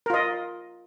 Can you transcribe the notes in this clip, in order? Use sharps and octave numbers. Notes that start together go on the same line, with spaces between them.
F4 A#4 D#5